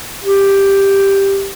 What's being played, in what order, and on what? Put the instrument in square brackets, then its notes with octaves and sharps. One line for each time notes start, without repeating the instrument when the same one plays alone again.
[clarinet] G4